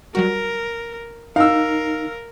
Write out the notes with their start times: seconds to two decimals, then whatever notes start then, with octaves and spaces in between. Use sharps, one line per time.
0.15 F#3 G3 F#4 A#4
1.36 D#4 A#4 F5 E6